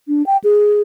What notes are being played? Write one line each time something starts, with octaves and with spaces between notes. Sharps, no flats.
D4
G5
G#4